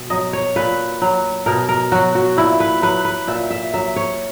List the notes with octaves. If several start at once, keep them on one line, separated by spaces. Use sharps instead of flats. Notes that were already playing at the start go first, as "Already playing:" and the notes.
Already playing: B2
F#3 D#5
C#5
A#2 B4
F#3
B2 A#4
A#4
F#3 F#4
F#4
A#2 E4
B4
F#3 B4
B4
A#2 E5
E5
F#3 E5
C#5